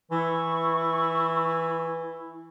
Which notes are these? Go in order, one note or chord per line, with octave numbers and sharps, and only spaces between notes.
E3 E4 C#6